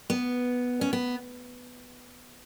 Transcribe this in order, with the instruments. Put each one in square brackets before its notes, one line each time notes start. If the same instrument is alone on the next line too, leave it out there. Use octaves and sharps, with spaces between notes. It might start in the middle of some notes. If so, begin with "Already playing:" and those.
[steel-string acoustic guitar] B3
C#4
B3